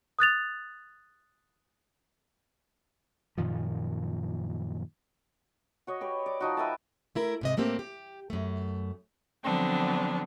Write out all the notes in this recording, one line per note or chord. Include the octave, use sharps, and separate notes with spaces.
D#6 F#6 A6 F7
F#2 A#2 D#3 F3
F#4 C#5 D#5
G4 B4 C#5
D5
F3 D#4 F#4
B4 E5 G5 A5
A3 E4 A#4
G#2 C3 D#5
A2 A3 A#3 C4 G4
G4
F#2 A3
D3 F3 F#3 B3 C4 D4